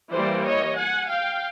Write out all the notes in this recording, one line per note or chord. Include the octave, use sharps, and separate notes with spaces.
E3 G3 A#3 C5 D5
C#5 D#5
F#5 G#5
F5 G5